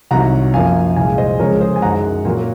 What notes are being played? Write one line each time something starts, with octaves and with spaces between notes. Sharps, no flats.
C2 C3 D#3 F#3 F#5 A#5
F#2 F3 A#3 F5 G#5
C2 A#2 G#3 F5 G#5
C5 D#5
C#2 C#3 F3 G#3 A#4 C#5
G#4 C5
G#5
F#2 D#3 G#3 F#5 A#5
A#2 F#3 A#3